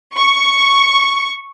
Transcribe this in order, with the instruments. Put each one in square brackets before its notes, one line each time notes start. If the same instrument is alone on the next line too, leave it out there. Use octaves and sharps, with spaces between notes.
[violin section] C#6